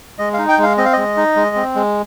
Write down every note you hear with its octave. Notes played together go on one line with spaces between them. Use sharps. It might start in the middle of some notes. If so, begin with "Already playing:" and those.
G#3 D#5
D#4 F5
G5
G#3 F5
C4 D#5
F5
G#3 D#5
D#4
G#3
C4
G#3